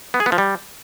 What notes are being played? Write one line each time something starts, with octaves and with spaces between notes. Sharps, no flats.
B3
G#4
B3
F3
G3